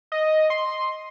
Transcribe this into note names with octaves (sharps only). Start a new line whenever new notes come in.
D#5
C6